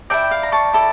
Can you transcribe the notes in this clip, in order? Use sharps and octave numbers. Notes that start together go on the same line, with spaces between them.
E4 A4 D5 E5 G5
F5
A#5
A5 C#6
E4 A4 D5